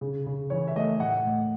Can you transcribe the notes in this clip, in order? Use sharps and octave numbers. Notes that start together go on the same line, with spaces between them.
C#3
C#3
E3 C#5
E5
A3 D#5
A2 F#5
A2